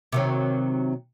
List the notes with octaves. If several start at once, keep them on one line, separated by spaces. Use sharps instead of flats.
C3 D#3 F#3